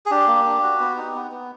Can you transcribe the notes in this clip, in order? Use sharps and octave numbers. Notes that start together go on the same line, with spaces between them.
G#4
D4 G4
A#3
D4
F#4
B3
D#4
B3
B3